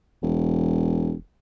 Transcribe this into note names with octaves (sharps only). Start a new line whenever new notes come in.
E1